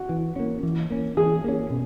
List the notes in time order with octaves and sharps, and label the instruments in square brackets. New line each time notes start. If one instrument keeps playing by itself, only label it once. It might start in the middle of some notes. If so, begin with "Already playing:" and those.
Already playing: [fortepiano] F#4
[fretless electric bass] E3
A#3 C#4
E3
A#3 C#4
[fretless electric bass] E3 [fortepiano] G#4
[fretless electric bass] A#3 C#4
B2